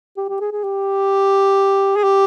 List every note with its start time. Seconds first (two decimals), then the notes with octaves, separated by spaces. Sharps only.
0.17 G4
0.29 G4
0.41 G#4
0.52 G#4
0.64 G4
1.96 G#4
2.04 G4